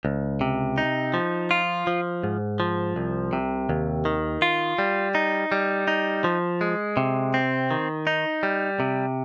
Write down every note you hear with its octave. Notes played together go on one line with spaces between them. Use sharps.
C#2
C3
D#4
F3
F4
F3
G#2
F3
C2
C3
D#2
D#3
F4
G3
D#4
G3
D#4
F3
G#3
C3
C4
D#3
D#4
G3
C3